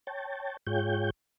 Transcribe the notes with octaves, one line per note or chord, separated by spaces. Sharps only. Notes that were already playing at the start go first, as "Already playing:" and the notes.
C#5 G5 A5
G#2 F4 G#4 C#5 G5 G6